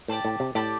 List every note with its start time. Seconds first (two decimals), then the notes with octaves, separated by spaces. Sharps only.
0.08 A2 G4 D5 A5
0.25 A2
0.40 C3
0.55 A2 G4 D5 A5